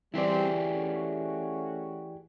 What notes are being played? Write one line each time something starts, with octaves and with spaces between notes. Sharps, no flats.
E3 G3 C4 E4 G4 G#4 B4 D5
A3 C#4 F#4